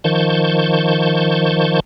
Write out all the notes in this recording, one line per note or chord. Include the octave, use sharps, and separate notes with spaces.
D#3 F3 A5 C#6 G6